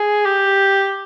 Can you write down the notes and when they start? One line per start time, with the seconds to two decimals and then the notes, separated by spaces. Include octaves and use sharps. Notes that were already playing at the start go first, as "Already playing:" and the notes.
Already playing: G#4
0.26 G4